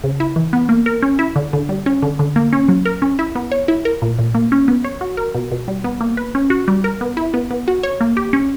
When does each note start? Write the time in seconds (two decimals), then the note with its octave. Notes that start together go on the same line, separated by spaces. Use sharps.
0.04 C#3
0.20 E4
0.36 E3
0.53 B3
0.69 A#3
0.86 A#4
1.02 C#4
1.19 E4
1.36 D3
1.53 D3
1.69 G3
1.86 C#4
2.02 D3
2.19 D3
2.36 A#3
2.53 C#4
2.68 F#3
2.85 A#4
3.02 C#4
3.19 E4
3.35 B3
3.52 C#5
3.68 E4
3.85 A#4
4.02 A#2
4.19 A#2
4.35 A#3
4.52 C#4
4.68 B3
4.84 C#5
5.01 F#4
5.17 A#4
5.35 B2
5.52 B2
5.68 G3
5.84 B3
6.01 A#3
6.17 B4
6.35 C#4
6.50 F#4
6.68 G3
6.84 A#4
7.01 B3
7.17 E4
7.34 B3
7.51 B3
7.68 F#4
7.83 C#5
8.01 A#3
8.17 G4
8.33 C#4